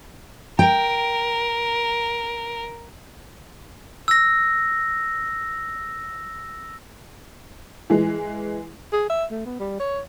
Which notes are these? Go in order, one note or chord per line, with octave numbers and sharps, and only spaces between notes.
A#4 G5
E6 A#6
E3 G#3
G#4
E5
A3
B3
G3
C#5